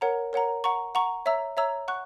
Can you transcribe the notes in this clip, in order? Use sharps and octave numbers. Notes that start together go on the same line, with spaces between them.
A#4 C#5 F#5 A#5
A#4 C#5 F#5 A#5
F#5 A#5 C#6
F#5 A#5 C#6
C#5 E5 A#5 E6
C#5 E5 A#5 E6
F#5 C#6 F#6